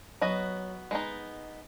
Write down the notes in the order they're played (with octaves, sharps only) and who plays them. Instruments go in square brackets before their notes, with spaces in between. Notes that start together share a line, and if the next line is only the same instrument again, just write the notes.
[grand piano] F#3 [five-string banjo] B3 F#4 D#5
[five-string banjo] G#3 B3 D#4